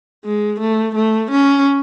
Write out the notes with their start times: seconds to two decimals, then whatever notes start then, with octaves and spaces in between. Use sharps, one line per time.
0.25 G#3
0.60 A3
0.96 A3
1.31 C#4